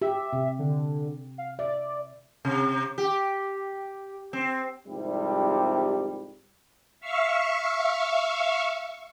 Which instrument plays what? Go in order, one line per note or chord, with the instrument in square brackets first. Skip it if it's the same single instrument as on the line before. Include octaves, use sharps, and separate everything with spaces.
[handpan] G4 [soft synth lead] E5
[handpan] C3
[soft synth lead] D3
F5
[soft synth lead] D5 [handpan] E5
[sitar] C3
G4
C4
[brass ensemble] C2 G#2 C3 D#3 F3 G3
[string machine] E5 F5 C#6